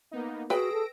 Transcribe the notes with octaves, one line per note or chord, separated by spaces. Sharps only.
A#3 B3 D#4
F#4 G#4 B4 G5 E6 A#6 D7
A4